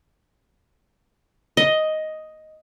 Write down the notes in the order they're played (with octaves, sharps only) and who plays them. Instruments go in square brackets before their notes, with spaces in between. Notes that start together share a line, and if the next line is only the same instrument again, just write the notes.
[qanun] D#5